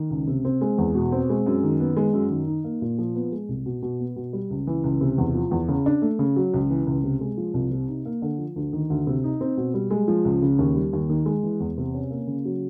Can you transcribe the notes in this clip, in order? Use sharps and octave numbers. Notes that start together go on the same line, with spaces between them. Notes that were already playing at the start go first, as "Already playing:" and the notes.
Already playing: D#3
C#2
C3
C4
G#3
E2
B2
C4
G#3
F#2
D#3
B3
G#3
F#2
D#3
D#4
A#3
A#2
F3
B3
G#3
C2
B2
B2
B3
B2
G3
C#2
E3
C#2
C3
E2
F3
E2
C#3
D4
A3
C#3
F#3
C#2
E3
C#2
C3
G#3
F3
C2
C3
D#4
A#3
D3
F3
D2
D#3
D2
C3
D#4
C4
B2
G3
G#3
F3
C#2
C#3
D#2
G3
D#2
D#3
G#3
E3
E2
C3
C#4
A#3
C#3
F#3